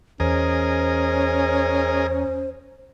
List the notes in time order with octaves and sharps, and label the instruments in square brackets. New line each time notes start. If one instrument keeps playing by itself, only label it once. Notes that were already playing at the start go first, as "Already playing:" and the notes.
[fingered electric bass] E2 [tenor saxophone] C#4 [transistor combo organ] G#4 A#4 D#5 [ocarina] C5